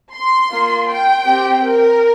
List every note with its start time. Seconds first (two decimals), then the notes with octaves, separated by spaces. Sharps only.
0.13 C6
0.51 A#3 F4
0.89 G5
1.26 C4 G4
1.64 A#4